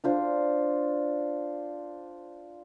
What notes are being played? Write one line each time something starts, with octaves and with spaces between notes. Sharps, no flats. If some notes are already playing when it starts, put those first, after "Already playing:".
D4 F4 C5